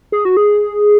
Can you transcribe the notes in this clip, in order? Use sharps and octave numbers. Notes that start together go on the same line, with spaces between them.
G#4
F#4
G#4